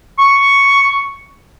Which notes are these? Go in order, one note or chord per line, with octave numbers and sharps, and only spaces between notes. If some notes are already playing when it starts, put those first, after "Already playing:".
C#6